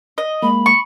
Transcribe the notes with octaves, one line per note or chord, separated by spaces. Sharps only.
D#5
G#3 A#3 B5
C#6